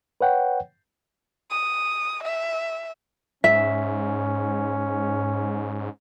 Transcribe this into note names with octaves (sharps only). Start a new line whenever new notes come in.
B4 C#5 F#5 G5
D#6
E5
G#2 C#4 E5